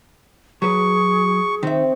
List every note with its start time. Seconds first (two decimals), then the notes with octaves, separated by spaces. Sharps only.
0.62 F#3 F#4 G#4 B4 C#6
1.63 D#3 C4 E5